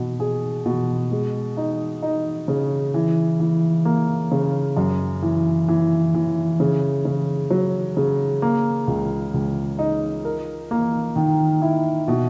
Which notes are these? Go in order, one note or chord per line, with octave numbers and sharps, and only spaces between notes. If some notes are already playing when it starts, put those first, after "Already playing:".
Already playing: B2
G#4
B2
G#3
D#4
D#4
C#3
E3
E3
A#3
C#3
F#2
E3
E3
E3
C#3
C#3
F#3
C#3
A#3
C#2
C#2
D#4
A#4
A#3
D#3
E4
B2